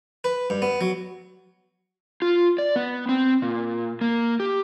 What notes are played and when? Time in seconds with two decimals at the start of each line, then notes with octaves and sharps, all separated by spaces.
0.24 B4
0.50 G2
0.62 B3
0.81 F#3
2.22 F4
2.58 D5
2.76 B3
3.09 C4
3.42 A#2
4.01 A#3
4.40 G4